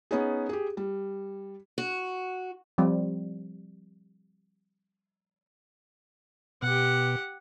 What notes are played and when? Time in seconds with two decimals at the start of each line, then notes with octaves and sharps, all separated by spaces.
0.11 B3 C#4 D#4 G#4
0.49 G4 G#4
0.77 G3
1.78 F#4
2.78 F3 G3 C4
6.62 B2 G4 F#5